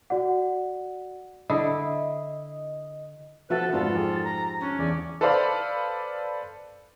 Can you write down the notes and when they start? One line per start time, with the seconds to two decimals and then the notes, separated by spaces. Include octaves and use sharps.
0.10 F#4 D5 F#5
1.50 D3 E4 D#5
3.50 F3 F#4 A4 B4 E5 F#5
3.73 F2 G#2 B3 D4 F4 F#4 A4
3.95 F3 G4 G#4
4.24 A#5
4.60 C#4 D4
4.79 E2 G#4 D5
5.21 A4 B4 C5 D5 F5